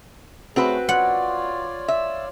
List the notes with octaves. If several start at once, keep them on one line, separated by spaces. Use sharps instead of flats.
A3 C4 C#4 F#4 G#4 B4
F4 C#5 D5 F#5
E5